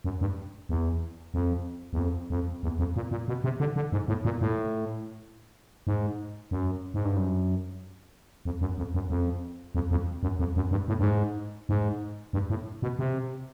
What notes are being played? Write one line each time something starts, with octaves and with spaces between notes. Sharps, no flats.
F#2
G2
E2
F2
E2
F2
F2
E2
F2
A#2
A#2
B2
C3
D3
D3
G#2
A2
A#2
A2
G#2
F#2
G#2
G2
F#2
F2
F#2
F2
F#2
F2
F2
F2
F#2
F2
F#2
G2
A2
G2
G#2
G#2
G2
A2
B2
C3